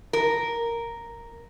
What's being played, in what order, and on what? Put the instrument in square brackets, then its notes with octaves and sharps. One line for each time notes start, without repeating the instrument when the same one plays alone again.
[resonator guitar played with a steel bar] A#4